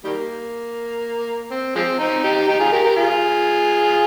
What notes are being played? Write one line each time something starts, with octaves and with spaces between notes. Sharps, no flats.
D#3 G3 A#3
C4
F3 G#3 C4
C4 D#4
D#4 G4
D#4 G4
F4 G#4
G4 A#4
G4 A#4
F4 G#4